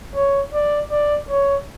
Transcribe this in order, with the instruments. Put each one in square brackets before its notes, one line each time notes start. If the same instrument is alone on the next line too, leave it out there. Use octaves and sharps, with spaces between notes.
[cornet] C#5
D5
D5
C#5